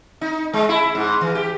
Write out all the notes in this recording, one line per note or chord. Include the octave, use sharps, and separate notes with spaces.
D#4
G#3
E4
G#2
E3
G4